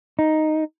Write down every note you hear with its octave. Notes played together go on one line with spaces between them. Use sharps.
D#4